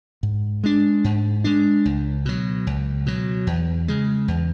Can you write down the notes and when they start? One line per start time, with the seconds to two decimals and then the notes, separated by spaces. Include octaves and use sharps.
0.23 G#2
0.64 G#3 D4
1.04 G#2
1.44 G#3 D4
1.85 C#2
2.25 B2 F#3
2.67 C#2
3.06 B2 F#3
3.47 E2
3.88 C#3 G#3
4.28 E2